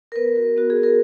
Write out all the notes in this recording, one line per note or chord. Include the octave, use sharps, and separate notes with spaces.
A#4
B3 B4
F#4
B3 F#4
G#4
F#4
A#4